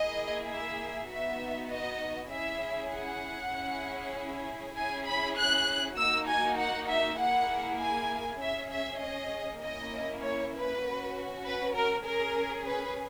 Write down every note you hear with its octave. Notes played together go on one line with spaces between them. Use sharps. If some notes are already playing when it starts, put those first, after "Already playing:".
Already playing: A#3 E4 G#4 D#5
E5
B3 D#4 F#4 E5
D#5
C#4 E4 G#4 E5
F#5
C#4 E4 G#4
C#4 E4 G#4 G#5
B5
F#6
A#3 D#4 F#4 E6
G#5
F#5
E5
A#3 E4 G#4 F#5
G#5
C#4 G#4 E5
E5
D#5
A#3 C#4 E4 D#5
C#5
B4
C#4 F#4
B4
A#4
C#4 G#4 A#4
B4